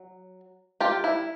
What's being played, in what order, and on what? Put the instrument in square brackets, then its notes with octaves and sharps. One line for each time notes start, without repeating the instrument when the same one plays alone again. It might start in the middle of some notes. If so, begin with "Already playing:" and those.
Already playing: [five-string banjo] F#3
F4 G4
E4